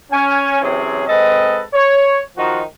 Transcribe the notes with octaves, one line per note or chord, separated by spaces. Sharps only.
C#4 G#5
C3 E3 F#3 C4 C#4 G#4
G#3 C4 A4 B4 D#5
C#5
D#3 F3 D#4 F4 F#4